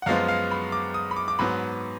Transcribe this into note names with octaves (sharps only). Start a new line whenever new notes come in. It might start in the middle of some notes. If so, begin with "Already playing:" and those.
F#5
F#2 F3 G#3 B3 F5
F5
B5
D6
D#6
B5
D6
D6
G#2 F#3 B3 B5